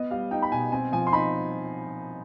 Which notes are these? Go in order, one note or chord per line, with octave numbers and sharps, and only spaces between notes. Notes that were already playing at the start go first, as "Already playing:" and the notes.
Already playing: B3 D#5
G3 F5
D#4 G5
B5
B2 G#5
C4 G#5
F3 G#5
C6
D#4 B5